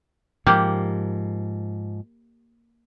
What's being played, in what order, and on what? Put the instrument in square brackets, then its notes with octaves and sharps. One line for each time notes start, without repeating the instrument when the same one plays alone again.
[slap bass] G#2 F3 [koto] A#3 G4